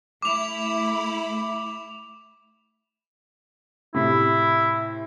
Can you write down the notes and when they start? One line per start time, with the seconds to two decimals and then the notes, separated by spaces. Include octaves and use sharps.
0.22 A3 E4 B5 D6 F7
3.94 A2 C3 E4